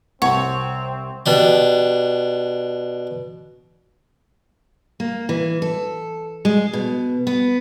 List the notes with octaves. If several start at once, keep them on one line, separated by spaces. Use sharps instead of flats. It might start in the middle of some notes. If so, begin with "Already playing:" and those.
C2 C4 C#5 F#5
B2 D4 G4
A#3
E3
A4
G#3
B2
B3